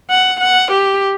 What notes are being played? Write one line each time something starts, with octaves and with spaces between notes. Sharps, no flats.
F#5
F#5
G4